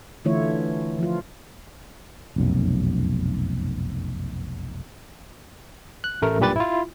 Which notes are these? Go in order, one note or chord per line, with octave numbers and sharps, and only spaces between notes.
D3 E3 A3 E4 F4 C#5
F3 F4
F1 B1 F#2
F#6
A1 A3 A#4
B1 G2 A#2 G4 B4 A6
E4 F4